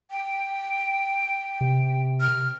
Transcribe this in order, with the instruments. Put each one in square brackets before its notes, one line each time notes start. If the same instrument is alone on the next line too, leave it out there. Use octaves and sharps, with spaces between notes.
[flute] G5
[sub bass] C3
[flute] F6